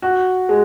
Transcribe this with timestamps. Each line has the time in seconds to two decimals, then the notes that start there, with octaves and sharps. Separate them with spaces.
0.02 F#4
0.49 G#3